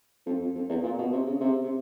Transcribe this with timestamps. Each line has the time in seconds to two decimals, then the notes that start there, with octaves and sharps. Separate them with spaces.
0.26 F2
0.41 F2
0.55 F2
0.69 E2
0.83 A#2
0.99 B2
1.12 C3
1.26 C#3
1.41 C3
1.64 C3